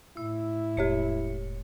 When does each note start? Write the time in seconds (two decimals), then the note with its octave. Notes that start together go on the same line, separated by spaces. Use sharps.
0.17 A2 E4 E6
0.77 E1 G4 C#5 C#7